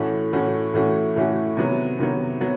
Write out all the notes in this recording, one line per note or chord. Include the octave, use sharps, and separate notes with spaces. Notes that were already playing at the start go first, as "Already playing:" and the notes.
Already playing: A2 E3 A3 C#4 F#4
A2 E3 A3 C#4 F#4
A2 E3 A3 C#4 F#4
A2 E3 A3 C#4 F#4
C3 D#3 F#3 B3
C3 D#3 F#3 B3
F#3 B3